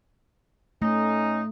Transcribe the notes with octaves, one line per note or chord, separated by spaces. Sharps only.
A3 C#4 D#4